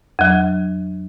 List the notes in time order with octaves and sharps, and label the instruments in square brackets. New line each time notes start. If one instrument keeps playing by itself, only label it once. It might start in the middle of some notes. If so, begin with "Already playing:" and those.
[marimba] F2 F#3